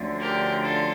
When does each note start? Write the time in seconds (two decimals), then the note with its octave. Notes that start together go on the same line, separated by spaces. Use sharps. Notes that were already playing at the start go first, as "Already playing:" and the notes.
Already playing: D2 D3 F3 C#4
0.21 G4 A#4
0.64 F4 A4